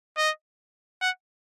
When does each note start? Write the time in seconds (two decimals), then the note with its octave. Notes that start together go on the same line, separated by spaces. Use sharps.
0.17 D#5
1.01 F#5